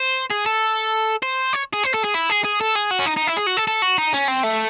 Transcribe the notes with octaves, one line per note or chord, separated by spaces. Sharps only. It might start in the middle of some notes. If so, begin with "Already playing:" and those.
Already playing: C5
G#4
A4
C5
C#5
G#4
C5
A4
G#4
E4
G#4
G#4
A4
G#4
F#4
C#4
D#4
D#4
E4
G#4
F#4
A4
A4
F#4
D#4
C#4
C4
A3